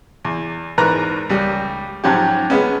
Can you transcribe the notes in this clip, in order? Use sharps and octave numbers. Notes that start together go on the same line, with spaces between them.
E2
E2 G#2 A#4 B4 A#5 F#6
C#2 G3
G#2 F3 F#3 C#4 G4
G#3 B3 C#4